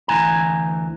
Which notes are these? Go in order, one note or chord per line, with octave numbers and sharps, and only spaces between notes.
D2 E3 G#5 A#5